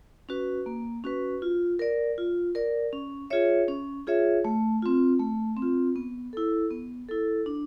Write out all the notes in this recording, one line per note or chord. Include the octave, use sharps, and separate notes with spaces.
C#4 F#4 B4
A#3
C#4 F#4 B4
F4
A#4 D5
F4
A#4 D5
C#4
F4 G#4 C#5 E5
C#4
F4 G#4 C#5 E5
A3
C4 F4
A3
C4
F4
B3
E4 A4
B3
E4 A4
D4